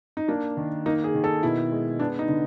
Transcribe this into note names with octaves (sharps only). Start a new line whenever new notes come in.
D#4
A#3 D4
D#3
A#3 D#4
G#4
D#3
A4
B2 E4
G#3
B3 D4
D#4
D3